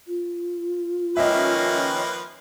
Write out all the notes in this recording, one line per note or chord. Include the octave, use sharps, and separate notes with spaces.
F4
D#3 F3 G#3 A#3 C#4 B4 D#5 E5